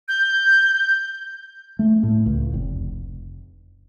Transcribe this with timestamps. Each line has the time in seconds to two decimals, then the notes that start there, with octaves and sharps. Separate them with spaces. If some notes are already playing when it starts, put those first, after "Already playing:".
0.08 G6
1.79 A3
2.03 A2
2.26 C#2
2.54 F1